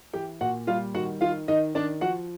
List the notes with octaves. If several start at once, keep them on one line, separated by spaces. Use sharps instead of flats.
E3 G4 G5
A#2 F#4 F#5
G3 F4 F5
D#3 F#4 F#5
D#3 F4 F5
D#3 D#4 D#5
D#3 D4 D5
F3 F#4 F#5